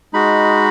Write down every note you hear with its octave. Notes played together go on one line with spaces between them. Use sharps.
G#3 D#4 F#4 B5